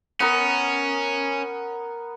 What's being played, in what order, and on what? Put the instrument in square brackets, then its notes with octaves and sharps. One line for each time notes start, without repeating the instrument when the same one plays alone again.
[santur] B3 A#4 [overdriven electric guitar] C#4